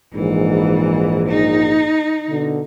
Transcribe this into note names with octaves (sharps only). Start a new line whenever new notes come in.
A#1 G#2 E3
D#4
B2 D3